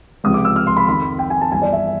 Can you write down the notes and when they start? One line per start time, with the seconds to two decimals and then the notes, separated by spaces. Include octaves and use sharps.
0.24 C#2 C3 F3 D#6
0.34 D6
0.45 E6
0.56 F6
0.67 C6
0.77 B5
0.88 F2 C3 D#3 B5
1.19 G5
1.30 G#5
1.41 A5
1.52 G1 G2 E3 G#5
1.62 D5
1.73 E5